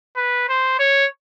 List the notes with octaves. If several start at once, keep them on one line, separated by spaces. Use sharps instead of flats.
B4
C5
C#5